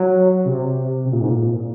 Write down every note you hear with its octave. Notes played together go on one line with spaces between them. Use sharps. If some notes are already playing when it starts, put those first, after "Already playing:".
Already playing: F#3
C3
C3
A#2
G#2
A#2